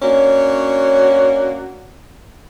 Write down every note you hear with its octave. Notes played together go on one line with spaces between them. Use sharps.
A#3 C#4 D4 F#4 C#5